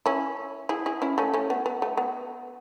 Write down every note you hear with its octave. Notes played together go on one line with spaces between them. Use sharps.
C#4 E4
E4 G#4
E4 G#4
C#4 E4
A3 C#4
A3 C#4
B3
B3
A3
B3